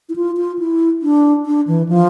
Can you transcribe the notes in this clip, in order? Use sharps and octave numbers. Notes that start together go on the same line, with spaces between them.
E4
F4
F4
E4
D4
D4
E3
F3